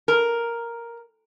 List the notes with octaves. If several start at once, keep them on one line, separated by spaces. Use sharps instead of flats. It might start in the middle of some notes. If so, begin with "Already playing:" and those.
A#4